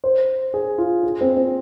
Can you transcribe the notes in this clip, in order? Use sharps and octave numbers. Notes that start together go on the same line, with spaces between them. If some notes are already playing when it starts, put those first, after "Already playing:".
C5
G#4
F4
G#4
C4
C4